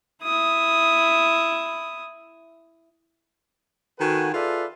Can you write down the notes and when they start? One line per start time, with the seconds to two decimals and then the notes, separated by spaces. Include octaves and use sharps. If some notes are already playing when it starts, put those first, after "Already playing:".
0.23 E4 D#6
3.99 D#3 F#4 A4 B4 F#5 G#5
4.33 F4 G#4 A4 B4 D5 E5